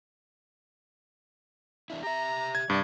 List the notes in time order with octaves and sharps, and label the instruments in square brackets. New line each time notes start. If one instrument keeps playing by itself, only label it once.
[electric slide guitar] E2 D4 E4
[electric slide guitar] G4 E5 [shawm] A#5
[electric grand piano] G#6
[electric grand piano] G2 [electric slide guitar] C3 G3 [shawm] D5